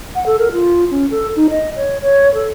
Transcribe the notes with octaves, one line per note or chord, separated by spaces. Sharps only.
F#5
A4
A#4
F4
C#4
A4
D#4
D#5
C#5
C#5
A4